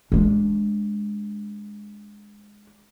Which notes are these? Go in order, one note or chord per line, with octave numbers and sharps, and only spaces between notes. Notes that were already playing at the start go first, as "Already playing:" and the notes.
G#3 D4